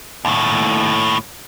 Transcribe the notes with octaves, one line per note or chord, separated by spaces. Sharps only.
D#2 A2